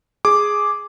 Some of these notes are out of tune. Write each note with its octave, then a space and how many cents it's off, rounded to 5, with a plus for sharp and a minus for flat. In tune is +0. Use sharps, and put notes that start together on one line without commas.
G#4 +0 D6 +0